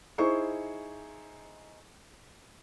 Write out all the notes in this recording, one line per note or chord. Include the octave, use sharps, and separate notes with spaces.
D#4 E4 G#4 C5 C#6